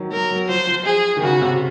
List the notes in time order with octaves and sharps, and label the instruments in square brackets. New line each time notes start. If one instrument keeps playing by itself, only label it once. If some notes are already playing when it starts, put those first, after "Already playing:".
Already playing: [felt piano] D#3 F#3
[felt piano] F#3 [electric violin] A#4
[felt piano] F#3
[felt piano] F3 [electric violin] C5
[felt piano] F3
[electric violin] G#4
[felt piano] D#3
[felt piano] C#3 [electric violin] F#4
[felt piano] C3